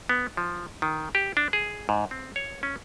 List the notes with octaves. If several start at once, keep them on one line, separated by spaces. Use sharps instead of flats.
B3
F3
D#3
G4
D4
G#4
G#2
C4
C#5
C#4